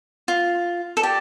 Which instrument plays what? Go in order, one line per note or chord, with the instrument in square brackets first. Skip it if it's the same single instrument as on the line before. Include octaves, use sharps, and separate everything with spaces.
[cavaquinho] F4
A4
[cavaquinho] G4 [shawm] D5